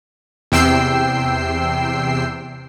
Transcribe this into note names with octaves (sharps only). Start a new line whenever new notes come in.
E2 C3 G5 E6 C7